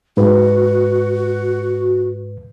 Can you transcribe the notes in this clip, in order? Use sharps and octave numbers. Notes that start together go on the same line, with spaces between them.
G#2 F#4 B4